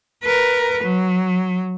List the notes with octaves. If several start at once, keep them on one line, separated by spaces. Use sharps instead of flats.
A#4 B4
F#3